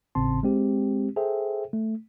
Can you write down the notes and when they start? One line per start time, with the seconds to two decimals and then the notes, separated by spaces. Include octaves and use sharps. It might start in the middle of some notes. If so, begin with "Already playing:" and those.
0.15 G#1 A2 C#3 C4 A5 C6
0.43 G#3 C4 G4
1.16 G#4 A4 C5 E5 G5
1.73 A3